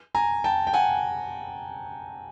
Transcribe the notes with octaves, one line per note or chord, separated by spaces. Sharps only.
G#5 A#5
G5 A5
G5
F#5 G#5